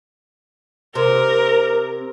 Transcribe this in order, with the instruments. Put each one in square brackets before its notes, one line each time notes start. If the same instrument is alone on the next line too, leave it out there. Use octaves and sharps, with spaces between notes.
[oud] C3 [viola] A#4